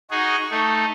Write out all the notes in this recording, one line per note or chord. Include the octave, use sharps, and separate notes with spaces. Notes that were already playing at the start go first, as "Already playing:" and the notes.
D#4 F#4 G#4 C#6
A3 D#4